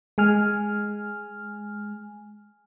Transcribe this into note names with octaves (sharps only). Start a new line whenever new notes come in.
G#3 G#5 F6